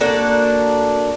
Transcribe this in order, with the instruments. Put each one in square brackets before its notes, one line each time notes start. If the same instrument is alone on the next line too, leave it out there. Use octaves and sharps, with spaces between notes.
[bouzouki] A#3 D4 F#4 A4